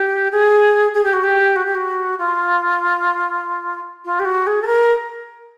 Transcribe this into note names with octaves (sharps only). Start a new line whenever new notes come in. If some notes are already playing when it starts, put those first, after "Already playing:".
Already playing: G4
G#4
G#4
G4
F#4
G4
F#4
G4
F#4
F4
F4
G4
F#4
G#4
A4
A#4